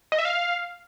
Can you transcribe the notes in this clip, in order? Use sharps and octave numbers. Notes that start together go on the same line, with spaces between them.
D#5
E5
F5